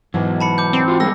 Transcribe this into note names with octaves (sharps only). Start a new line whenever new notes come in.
G#2 B2 E3 F#3
A5 B5 C#7
D6 G6
C4
F4 F#4
G3 G#3 B3 E6 A#6